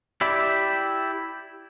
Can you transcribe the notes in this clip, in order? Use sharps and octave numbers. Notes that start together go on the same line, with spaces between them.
E4 G4 D5 E5 B5